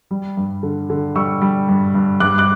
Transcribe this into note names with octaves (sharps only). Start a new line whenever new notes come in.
G3
G2
D3
D3
G3 C#6 E6
G3
G2
G2
G2 D6 F#6
D6 F#6